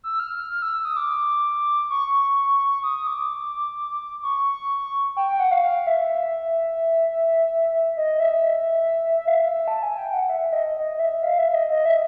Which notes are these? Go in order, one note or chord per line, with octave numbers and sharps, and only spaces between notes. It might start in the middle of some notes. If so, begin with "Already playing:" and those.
E6
F6
F6
F6
E6
E6
D#6
D6
C#6
D#6
D6
C#6
G5
G5
F#5
F5
F5
E5
E5
D#5
E5
F5
E5
E5
A5
G#5
G5
F#5
E5
D#5
D#5
E5
F5
E5
D#5
D#5
E5